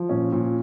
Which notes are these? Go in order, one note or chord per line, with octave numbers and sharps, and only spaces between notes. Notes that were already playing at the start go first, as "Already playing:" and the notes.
Already playing: F3
A#2 C#4
A#2